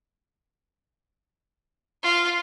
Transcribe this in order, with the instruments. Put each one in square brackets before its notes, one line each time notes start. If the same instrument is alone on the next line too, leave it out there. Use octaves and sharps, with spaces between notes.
[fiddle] F4